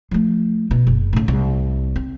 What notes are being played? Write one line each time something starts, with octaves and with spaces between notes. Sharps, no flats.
F3 A3
B2
F#1
A2 C#3
C2
C4